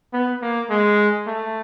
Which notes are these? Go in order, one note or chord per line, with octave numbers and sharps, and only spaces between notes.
B3
A#3
G#3
A3